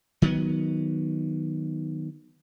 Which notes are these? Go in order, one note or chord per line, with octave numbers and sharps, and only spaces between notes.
D#3 F#3 B3